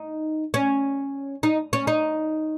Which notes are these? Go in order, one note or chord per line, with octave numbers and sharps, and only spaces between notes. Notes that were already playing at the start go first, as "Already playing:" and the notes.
Already playing: D#4
C#4
D#4
C#4
D#4